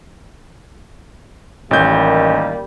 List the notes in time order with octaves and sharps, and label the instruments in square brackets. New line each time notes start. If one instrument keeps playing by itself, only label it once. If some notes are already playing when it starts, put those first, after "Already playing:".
[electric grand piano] A1 G6 [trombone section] D#3 G3 A#3